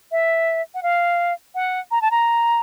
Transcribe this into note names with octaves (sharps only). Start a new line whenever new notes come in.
E5
F#5
F5
F#5
A#5
A5
A#5